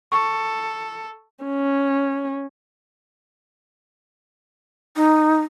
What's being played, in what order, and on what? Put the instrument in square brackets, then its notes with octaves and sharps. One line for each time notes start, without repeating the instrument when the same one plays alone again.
[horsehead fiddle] A4 [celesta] C#6
[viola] C#4
[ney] D#4